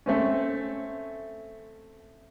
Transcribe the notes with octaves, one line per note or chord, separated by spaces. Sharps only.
A3 C4 C#4